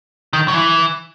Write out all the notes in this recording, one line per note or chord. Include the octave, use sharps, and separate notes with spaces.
D#3
F#3
E3